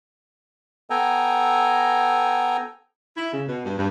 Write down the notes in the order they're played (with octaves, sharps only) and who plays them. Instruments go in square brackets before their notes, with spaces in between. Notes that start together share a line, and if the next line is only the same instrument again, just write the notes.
[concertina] B3 A4 G5 G#5 A#5
[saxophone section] E4
C#3
B2
G2
G2